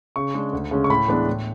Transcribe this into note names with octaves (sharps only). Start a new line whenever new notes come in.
C#3 C#6
G#3 D4
D2
C#3 G#3 C#4
C#6
A2 B5
E3 G#3 B3 D4
A2